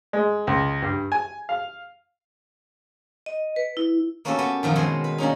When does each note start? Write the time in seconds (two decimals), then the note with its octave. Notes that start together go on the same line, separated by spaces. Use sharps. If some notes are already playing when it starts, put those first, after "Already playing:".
0.13 G#3
0.47 C#2
0.82 G2
1.12 G#5
1.49 F5
3.26 D#5
3.56 B4
3.77 E4
4.25 A#3 B3 C#4 F#4 G4 A4
4.39 B3
4.63 F#2 D#3 F3
4.76 B2 G#3 C4 F#5
5.04 B4
5.18 G3 A#3 C#4 D#4